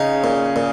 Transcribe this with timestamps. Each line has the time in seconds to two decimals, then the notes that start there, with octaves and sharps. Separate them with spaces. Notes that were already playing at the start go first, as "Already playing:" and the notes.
Already playing: C#3 D#4
0.24 A#2
0.56 A#2